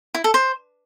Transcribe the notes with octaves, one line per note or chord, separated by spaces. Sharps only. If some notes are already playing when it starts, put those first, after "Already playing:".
E4
A4
C5